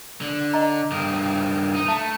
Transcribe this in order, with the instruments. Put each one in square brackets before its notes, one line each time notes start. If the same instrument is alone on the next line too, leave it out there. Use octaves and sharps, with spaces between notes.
[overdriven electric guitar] D3
[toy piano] D#5 A#5
[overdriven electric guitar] G2 D#3
D#4
[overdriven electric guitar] A3 [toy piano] E5 A5